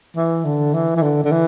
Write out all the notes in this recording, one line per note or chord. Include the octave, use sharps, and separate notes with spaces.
E3
D3
E3
E3
D3
D3
E3